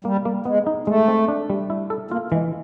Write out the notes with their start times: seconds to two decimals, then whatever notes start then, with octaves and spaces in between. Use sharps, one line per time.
0.05 G3 A#3
0.25 A#3
0.45 G#3 B3
0.67 D#4
0.87 G#3 A3
1.08 C4
1.28 D4
1.50 G3
1.70 E4
1.90 A4
2.11 A#3 F4
2.32 E3 G#3